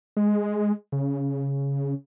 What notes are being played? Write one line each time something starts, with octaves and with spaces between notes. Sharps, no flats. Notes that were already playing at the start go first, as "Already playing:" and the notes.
G#3
C#3